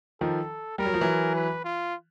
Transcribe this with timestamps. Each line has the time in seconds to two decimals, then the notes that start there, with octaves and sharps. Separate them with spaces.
0.21 D#3 F3 A4
0.78 G3 A#4
0.86 F#3
0.94 F3
1.01 E3 F#3
1.35 B4
1.64 F4